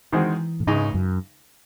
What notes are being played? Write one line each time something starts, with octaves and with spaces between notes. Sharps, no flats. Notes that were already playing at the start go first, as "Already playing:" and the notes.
D#3 E3 G#3 C4 F#4
A2
C#2 G#2 C#3 G#3 D#4
F#2